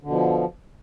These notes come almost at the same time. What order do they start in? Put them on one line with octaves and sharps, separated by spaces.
D3 B2 F3